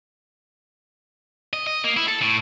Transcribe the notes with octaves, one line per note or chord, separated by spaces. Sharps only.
D#5
D#5
A#3
E4
A4
A2